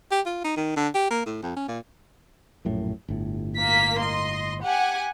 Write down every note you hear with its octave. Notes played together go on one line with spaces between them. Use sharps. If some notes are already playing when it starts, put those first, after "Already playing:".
G4
F4
D#4
D#3
D3
G4
A#3
A2
F2
C#4
A#2
A#1 F#2 A2
G1 A2
A#3 A#4 B6
D#5 C6
G4 F#5 G#5